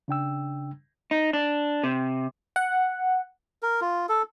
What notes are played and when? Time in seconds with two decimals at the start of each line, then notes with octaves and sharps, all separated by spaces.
0.08 C#3 D4 G5 E6
1.11 D#4
1.33 D4
1.83 C3
2.56 F#5
3.63 A#4
3.81 F4
4.09 A4